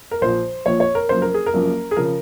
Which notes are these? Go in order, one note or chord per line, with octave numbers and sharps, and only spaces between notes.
A#4
A#1 A#2 F3 C5
A#1 A#2 F3 C#5
C#5
A#4
F#1 F#2 F3 A#3 C5
A#4
G#4
A#4
F#1 F#2 F3 A#3
G#4
C#3 F3 A#4